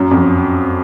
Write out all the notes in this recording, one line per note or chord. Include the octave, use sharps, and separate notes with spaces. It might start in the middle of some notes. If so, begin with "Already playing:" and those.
Already playing: F#2
F2